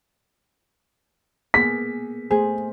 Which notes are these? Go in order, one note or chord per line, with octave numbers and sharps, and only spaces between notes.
A#3 B3 G#4 B6
A3 G#4 C5